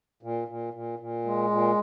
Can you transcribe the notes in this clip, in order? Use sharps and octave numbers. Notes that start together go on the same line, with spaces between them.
A#2
A#2
A#2
A#2
G#3
A#2